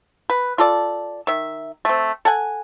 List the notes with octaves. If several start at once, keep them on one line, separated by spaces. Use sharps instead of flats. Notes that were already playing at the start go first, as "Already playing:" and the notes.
B4
F4 A4 D5
D#3 E5
A3 C4
A4 F#5 G#5